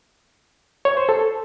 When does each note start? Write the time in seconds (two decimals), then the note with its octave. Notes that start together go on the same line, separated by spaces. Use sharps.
0.85 C#5
0.97 C5
1.09 A4